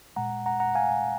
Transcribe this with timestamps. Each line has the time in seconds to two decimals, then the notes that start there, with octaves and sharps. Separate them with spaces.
0.16 A#2 G#3 F#5 A#5
0.46 F#5 A#5
0.60 F#5 A#5
0.75 F5 G#5